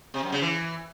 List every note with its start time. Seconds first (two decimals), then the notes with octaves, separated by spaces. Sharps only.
0.14 C3
0.23 F#2
0.32 C#3
0.42 E3